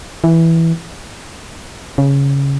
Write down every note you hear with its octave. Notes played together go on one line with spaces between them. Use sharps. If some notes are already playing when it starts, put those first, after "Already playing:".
E3
C#3